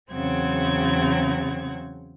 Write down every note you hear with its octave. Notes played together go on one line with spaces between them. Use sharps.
E2 C#3 F#3 C4 F#5 G#6